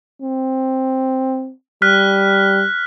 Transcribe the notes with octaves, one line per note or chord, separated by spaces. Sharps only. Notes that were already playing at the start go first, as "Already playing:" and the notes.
C4
G3 F6 F#6 B6